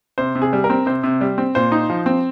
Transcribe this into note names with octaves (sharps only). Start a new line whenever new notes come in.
C3 C5
C3
G#4
G3
A#4
C4
C3 C5
C3
G3
C4
A#2 C5
D#4
F3
C4